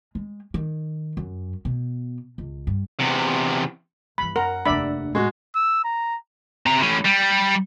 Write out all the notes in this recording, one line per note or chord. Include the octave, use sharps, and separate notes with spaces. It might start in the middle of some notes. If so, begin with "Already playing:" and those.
G#3
D#3
F#2
B2
C#2
G2
E2 C3
G1 E3 B5
F#2 A#4 F#5
F1 D#2 D4 D5 E5 B5
A2 G#3 F#4
E6
A#5
C3 A#5
A2 C#4
G3